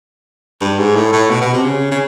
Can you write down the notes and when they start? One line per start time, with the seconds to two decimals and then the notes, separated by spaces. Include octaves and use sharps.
0.61 G2
0.78 G#2
0.95 A2
1.13 A2
1.30 B2
1.41 B2
1.53 C3
1.64 C#3
1.91 C#3